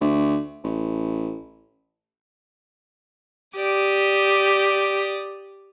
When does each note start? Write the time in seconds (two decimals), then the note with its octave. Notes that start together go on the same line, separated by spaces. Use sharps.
0.01 D2
0.64 A1
3.55 G4 D5 D#6